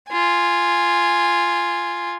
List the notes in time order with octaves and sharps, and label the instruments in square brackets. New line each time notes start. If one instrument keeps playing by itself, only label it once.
[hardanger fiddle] F4 G#5